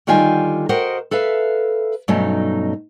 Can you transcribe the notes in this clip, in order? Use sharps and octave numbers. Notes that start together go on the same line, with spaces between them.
D3 D#3 G3 F4 G5 G#5
F#4 A#4 C5 D#5 F#5 G5
A4 B4 E5 F5
G2 B2 F#3 A3 C#4 D#4